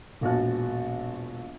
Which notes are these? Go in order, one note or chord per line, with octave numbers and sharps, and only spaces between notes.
E1 A#1 F#4 A5 F#6